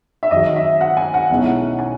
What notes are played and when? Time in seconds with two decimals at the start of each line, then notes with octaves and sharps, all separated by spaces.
0.23 E5
0.31 F#2 D#3 F#3 D#5
0.56 E5
0.81 F#5
0.97 G#5
1.14 F#5
1.30 B1 B2 G#3 C#4 E4
1.79 G#5